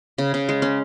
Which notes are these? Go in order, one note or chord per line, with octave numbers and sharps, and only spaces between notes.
C#3
C#3
G#3
C#4